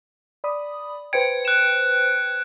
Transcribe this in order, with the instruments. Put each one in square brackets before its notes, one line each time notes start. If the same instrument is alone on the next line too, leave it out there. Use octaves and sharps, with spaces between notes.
[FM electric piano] D5 B5 D#6
[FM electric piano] B4 C5 G5 [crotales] G#6 C#7 D7
[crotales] F#6 E7